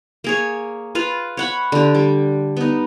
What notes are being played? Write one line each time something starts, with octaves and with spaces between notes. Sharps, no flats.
A#3 G#4 C#5
F4 B4 F5
C#5 F#5 B5
D3 G4
G3
B3 D#4